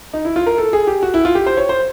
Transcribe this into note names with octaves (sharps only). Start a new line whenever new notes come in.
D#4
E4
F4
A#4
A4
G#4
G4
F#4
E4
F4
G4
C5
C#5
C5